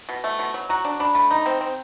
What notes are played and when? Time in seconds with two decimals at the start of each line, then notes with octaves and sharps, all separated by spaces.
0.09 B2
0.24 A3
0.39 B2
0.54 F#3
0.69 F#4 A#5
0.85 D4
1.00 D4 B5
1.14 A3 B5
1.31 D#4 A#5
1.46 C4
1.61 C4